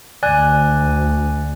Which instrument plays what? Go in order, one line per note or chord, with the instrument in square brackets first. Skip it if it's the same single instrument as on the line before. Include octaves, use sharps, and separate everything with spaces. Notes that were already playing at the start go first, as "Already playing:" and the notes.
[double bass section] D2 [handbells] D5 G#5 F#6